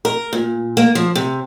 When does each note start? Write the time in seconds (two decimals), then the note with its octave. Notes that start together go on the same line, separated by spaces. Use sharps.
0.05 A#4
0.33 A#2
0.77 A#3
0.95 F3
1.15 C3